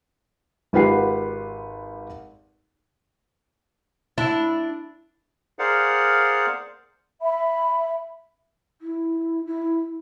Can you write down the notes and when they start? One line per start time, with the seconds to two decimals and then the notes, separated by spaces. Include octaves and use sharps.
0.73 G#1 F4 G4 B4 F#5 C7
4.18 D4 E4
5.59 G#4 A#4 C5 D5 F5 F#5
7.21 E5 B5
8.81 E4
9.47 E4